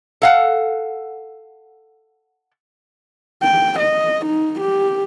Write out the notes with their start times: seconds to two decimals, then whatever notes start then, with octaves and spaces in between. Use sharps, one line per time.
0.22 A4 F5 F#5
3.43 G5
3.80 D#5
4.26 D#4
4.61 G4